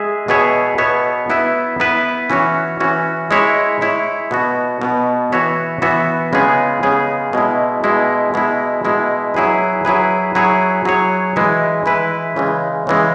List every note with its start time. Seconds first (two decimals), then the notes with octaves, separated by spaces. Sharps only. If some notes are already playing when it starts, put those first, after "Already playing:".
Already playing: G#3 G#4 E5
0.28 B2 B3 G#4 C#5 E5
0.78 B2 B3 G#4 C#5 E5
1.30 B3 E4 B4 E5
1.80 B3 E4 B4 E5
2.30 E3 C#4 F#4 C#5
2.80 E3 C#4 F#4 C#5
3.31 G#3 E4 C#5 E5
3.81 G#3 E4 C#5 E5
4.31 B2 B3 F#4
4.82 B2 B3 F#4
5.32 E3 B3 F#4 C#5 E5
5.82 E3 B3 F#4 C#5 E5
6.33 C#3 G#3 B3 G#4
6.83 C#3 G#3 B3 G#4
7.33 B2 G#3 E4
7.84 B2 G#3 E4
8.34 B2 G#3 E4
8.85 B2 G#3 E4
9.34 F#3 E4 G#4 B4
9.85 F#3 E4 G#4 B4
10.35 F#3 E4 G#4 C#5
10.85 F#3 E4 G#4 C#5
11.36 E3 G#3 E4 B4 E5
11.86 E3 G#3 E4 B4 E5
12.36 C#3 E3 G#3
12.87 C#3 E3 G#3